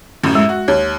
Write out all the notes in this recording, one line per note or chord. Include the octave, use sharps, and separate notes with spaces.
A1 F#2 A2
G#3
F#4
D#2 C#5